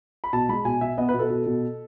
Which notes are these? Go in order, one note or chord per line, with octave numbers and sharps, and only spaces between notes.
B5
B2 A5
G#3 B5
B2 G#5
B2 E5
B3 D#5
B4
B2
A4
B2
B2